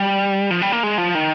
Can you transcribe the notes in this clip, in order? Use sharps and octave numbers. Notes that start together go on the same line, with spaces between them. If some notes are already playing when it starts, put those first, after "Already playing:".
Already playing: G3
F3
G3
A#3
G#3
F3
D#3